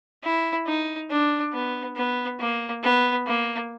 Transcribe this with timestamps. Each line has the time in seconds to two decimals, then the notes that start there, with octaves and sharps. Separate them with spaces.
0.23 E4
0.67 D#4
1.11 D4
1.53 B3
1.96 B3
2.40 A#3
2.83 B3
3.27 A#3